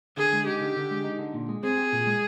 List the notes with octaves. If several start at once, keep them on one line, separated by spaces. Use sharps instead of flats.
D3 G#4
G#3
D#4 G4
D3
D3
G#3
D#4
D3
A#2
G#3
C4 G#4
G4
A#2
G#3